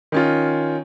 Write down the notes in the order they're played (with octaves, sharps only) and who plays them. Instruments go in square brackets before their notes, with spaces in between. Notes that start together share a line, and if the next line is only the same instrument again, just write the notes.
[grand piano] D#3 C#4 F4